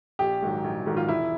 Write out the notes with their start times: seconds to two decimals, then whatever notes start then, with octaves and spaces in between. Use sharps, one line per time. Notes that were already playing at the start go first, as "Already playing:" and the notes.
0.19 A#1 G4
0.42 G#2 D#3 F#3
0.64 A#1
0.86 G#2 D#3 F#3
0.97 F4
1.08 E1 E4